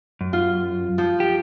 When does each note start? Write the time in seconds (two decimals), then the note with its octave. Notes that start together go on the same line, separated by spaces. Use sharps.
0.21 F#2
0.33 F4
0.98 F3
1.20 G4